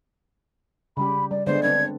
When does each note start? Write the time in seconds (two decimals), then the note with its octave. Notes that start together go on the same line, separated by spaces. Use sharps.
0.97 C#3 G3 G4 B5
1.31 G3 D5
1.47 D3 G#3 B3 C5 D5
1.63 C4 D4 B4 G#6